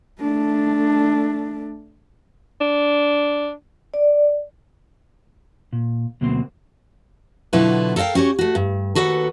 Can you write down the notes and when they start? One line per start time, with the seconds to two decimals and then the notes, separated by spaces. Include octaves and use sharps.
0.20 A3 D4
2.61 D4
3.94 D5
5.73 A#2
6.21 D2 B2 F#3 A#3 C4 C6
7.53 B2 D3 F#3 E4 F4 B4
7.96 A4 A#4 D5 F5 G5
8.15 C#4 F#4 G4 C#5
8.39 A3 F#4
8.55 G2
8.95 D#2 F#4 A4 B4 F#5